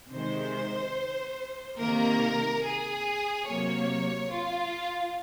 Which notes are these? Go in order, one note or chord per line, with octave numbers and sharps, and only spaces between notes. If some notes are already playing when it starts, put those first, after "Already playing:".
C3 D#3 G#3 C5
C3 D#3 A#3 A#4
G#4
C3 F#3 A#3 C#5
F4